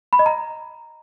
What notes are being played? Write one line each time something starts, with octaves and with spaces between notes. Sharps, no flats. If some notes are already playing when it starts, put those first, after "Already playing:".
B5
D#5
A#5